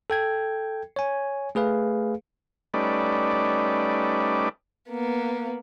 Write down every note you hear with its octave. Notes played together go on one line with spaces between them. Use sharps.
A4 G5 G#6
C#5 G#5
A3 G#4 B4 F5
G3 A3 C#4 D#4 B4 D5
A#3 B3